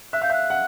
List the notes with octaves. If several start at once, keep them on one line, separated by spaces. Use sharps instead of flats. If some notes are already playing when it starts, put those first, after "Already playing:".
E5 F#6
F5 G6
E5 F#6
F#5